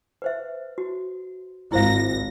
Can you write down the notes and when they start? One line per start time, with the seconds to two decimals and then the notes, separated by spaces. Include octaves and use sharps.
0.22 B4 C5 E5
0.78 F#4
1.72 G#1 E4 C5 F5 A#6